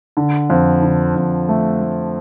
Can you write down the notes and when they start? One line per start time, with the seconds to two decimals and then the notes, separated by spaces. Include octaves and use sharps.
0.17 D3
0.50 F2
0.82 D3
1.16 F2
1.49 A3
1.81 A3